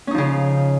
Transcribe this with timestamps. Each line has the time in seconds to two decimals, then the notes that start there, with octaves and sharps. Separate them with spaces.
0.07 C#4
0.11 D#4
0.14 F3
0.18 C#3